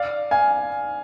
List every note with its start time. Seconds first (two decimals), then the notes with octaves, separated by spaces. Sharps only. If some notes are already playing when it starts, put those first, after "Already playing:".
Already playing: D5 F5
0.31 F5 G#5